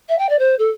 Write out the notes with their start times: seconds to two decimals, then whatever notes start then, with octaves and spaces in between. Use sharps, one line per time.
0.09 E5
0.18 G5
0.29 D5
0.38 C5
0.58 A4